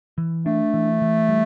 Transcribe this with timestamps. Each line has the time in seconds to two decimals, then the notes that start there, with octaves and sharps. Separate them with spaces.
0.18 E3
0.46 A3 D4
0.74 E3
1.02 E3
1.29 G3